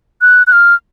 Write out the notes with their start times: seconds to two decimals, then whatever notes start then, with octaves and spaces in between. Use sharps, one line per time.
0.22 F#6
0.47 F#6
0.52 F6